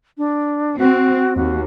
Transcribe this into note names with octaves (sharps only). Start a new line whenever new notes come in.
D4
C4 F#4
D#2 F#4